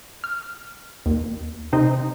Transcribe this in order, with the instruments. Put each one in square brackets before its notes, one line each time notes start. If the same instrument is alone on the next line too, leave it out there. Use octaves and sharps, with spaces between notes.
[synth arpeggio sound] F6
D#2
C3 C4 D#4 C5